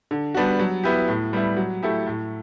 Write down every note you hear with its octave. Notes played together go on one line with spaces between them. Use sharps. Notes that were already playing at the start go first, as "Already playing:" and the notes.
D3
G3 B3 D4 F#4
F#3
B3 E4 G4
A2
G3 B3 E4
F#3
A3 E4 G4
A2